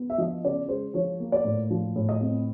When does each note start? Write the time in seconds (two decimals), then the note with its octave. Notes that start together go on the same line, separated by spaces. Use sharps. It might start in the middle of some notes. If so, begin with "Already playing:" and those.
Already playing: B3
0.10 E5
0.18 F3 D#5
0.44 C#3 D5
0.69 G#3 C5
0.94 F3 C#5
1.20 A#3
1.32 D5
1.45 A2
1.70 F3
1.96 A2
2.09 D#5
2.21 C4